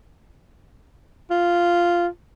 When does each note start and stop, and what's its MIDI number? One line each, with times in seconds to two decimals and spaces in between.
1.30 2.07 65